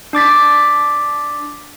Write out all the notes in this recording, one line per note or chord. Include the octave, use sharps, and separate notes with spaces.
D4 D6 A6 B6